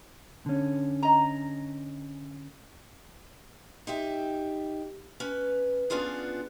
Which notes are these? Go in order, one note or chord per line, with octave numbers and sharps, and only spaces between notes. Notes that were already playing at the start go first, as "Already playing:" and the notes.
D3 C#4
D#5 A#5
D#4 G4 E5
C#4 B4
B3 C#4 D4 F4 G#4